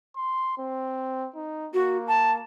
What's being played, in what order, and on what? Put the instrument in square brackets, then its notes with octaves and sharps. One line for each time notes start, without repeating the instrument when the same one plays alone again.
[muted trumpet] C6
C4
D#4
[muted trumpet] A#3 [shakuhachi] F#4
[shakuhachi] A5